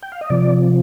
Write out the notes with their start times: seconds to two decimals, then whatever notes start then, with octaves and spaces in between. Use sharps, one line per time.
0.02 G5
0.12 F5
0.21 D#5
0.30 C3 F3 D5